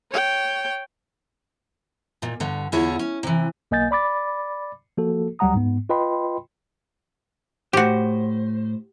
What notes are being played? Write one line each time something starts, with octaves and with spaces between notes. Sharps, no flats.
C#5 G5
A#2 D#3
G2 D3
E2 D3 E4 F4 G#4 C#5
C#4
C3 E3
B1 A#3 D#5 G#5 G6 A6
D5 B5 D6 A6
F3 A#3 F#4 A4
D2 F#3 G3 F#5 A#5 D#6
G#2 B3
F4 B4 D#5 G5 B5 C6
A2 F#4 G4 C5